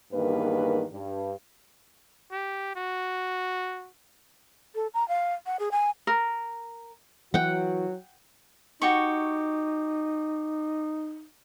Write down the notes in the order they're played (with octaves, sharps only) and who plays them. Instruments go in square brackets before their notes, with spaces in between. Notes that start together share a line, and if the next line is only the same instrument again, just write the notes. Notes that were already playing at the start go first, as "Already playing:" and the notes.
[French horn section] E2 G2 D#3 A#3 B4
G2
[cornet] G4
F#4
[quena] A4
A#5
F5
F#5
G#4
G#5
[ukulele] A#4
[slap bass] E3 [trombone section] F#3 F#4 [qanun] F#5 G5
[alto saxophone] D#4 [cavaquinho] F#4 G4 C#6